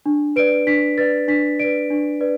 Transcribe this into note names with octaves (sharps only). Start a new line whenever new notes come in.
D4
B4 D5 D7
D4 B6
B4 D5 A6
D4 B6
B4 D5 D7
D4
B4 D5